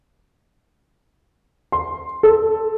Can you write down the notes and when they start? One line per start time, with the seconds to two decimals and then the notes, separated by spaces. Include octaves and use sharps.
1.72 C6
2.23 A4